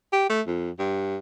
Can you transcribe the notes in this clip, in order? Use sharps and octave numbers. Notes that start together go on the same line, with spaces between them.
G4
A3
F2
G2